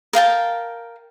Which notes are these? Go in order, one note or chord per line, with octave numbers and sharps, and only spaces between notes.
A#4 F5 G5 A5